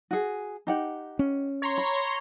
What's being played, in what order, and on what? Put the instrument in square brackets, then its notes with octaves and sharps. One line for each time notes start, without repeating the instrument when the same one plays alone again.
[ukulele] F#4 G#4
D#4 G4 F#5
[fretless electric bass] C#4
[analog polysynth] C#5 A#5 C6
[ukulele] B5